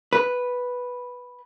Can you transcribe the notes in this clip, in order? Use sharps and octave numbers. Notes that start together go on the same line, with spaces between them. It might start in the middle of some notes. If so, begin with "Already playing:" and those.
B4